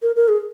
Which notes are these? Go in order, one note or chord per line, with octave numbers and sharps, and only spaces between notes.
A#4
A#4
G#4